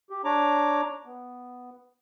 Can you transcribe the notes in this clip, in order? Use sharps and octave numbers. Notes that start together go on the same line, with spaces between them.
G4
D4 C#5 A#5 D6
B3